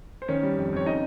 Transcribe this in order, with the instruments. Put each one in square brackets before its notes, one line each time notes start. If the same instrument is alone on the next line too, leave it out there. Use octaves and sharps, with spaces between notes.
[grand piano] C5
D#3 C#4 C#5
G3
F2
F2 C#5
C#3 D#4 D#5